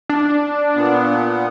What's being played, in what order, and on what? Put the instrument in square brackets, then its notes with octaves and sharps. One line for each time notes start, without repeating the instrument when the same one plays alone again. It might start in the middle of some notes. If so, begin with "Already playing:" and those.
[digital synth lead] D4
[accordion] A#2 B3